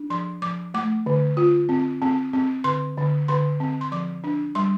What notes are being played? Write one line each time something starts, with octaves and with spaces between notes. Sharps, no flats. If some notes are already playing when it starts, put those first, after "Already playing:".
Already playing: D4
F3 C6
F3 D6
A3 D6
D3
F4
C4
C4
C4
D3 C6
D3
D3 C6
C4
C6
F3 D6
D4
G3 C6